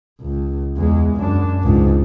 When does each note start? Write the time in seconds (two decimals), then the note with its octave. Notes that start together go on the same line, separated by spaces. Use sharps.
0.20 C#2
0.77 E2 G#3
1.16 F#2 D4
1.63 C#2 G#2